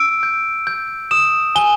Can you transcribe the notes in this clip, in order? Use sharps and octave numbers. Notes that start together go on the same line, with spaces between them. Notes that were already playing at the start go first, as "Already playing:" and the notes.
Already playing: E6 D7
G6
G6
D#6 E7
G#5 G7